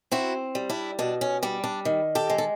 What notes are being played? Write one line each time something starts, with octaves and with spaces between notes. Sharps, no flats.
C4 E4 F#4
G3
D4 E4
B2 D4
C#4
G3 D4
D4
D#3
G4 A4
G#3
A4